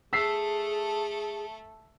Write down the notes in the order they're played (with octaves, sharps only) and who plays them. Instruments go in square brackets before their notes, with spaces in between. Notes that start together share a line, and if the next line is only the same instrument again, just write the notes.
[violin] A3 A4 [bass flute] G#4 [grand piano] E6 B6 C7